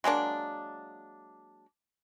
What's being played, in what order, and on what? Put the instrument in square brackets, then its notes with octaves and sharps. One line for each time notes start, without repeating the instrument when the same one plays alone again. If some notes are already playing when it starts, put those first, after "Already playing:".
[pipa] F#3 G#3 A#3 D4